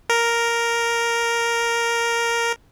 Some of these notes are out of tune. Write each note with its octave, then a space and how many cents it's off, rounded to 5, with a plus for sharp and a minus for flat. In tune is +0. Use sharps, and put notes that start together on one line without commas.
A#4 +0